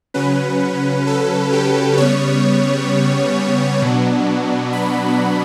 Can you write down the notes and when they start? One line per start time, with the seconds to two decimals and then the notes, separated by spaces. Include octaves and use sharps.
0.14 C#3 F#3 C#4 B4
1.07 A4
1.52 G4
1.97 C#3 G3 B3 C#5
3.82 B2 F#3 B3 D4
4.73 B5